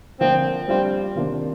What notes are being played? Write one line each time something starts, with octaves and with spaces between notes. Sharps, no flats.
D3 F3 A#3 C4
G3 C4 D4 F4
C3 D#3 A#3 D4 F4